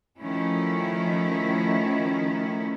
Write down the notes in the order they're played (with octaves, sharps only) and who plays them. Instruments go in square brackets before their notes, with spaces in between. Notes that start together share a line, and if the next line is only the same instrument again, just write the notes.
[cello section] D#3 F3 A3 C#4 E4